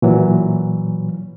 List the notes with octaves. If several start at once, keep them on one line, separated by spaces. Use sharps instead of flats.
A#2 E3 F#3